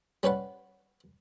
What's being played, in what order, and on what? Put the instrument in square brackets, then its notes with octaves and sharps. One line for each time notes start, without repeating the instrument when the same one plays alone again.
[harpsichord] G3 C#4 B4 F#5